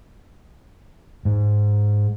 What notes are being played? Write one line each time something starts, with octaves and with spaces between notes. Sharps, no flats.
G#2